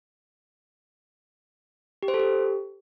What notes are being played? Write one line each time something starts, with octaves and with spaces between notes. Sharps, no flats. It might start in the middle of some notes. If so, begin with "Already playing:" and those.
G4
C5
A4
G4